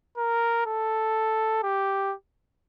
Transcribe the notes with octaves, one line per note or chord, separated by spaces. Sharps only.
A#4
A4
G4